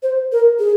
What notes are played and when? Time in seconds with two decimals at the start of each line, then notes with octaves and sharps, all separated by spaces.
0.03 C5
0.32 A#4
0.59 G#4